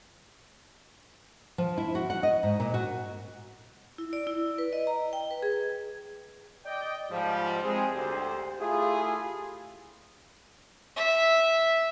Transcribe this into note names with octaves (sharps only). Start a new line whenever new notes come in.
F3
E4
F#4
F#5
D#5
G#2
A#2
F#4
E4
D5
E4
B4
D#5
A#5
G5
B4
G#4
D5 D#5 G5
G#2 F3 G3
G#3 C4 G#4
D2 G4 C5
A3 E4 F4 G4 G#4
E5